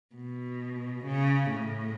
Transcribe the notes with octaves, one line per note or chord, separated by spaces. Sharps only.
B2
C#3
A2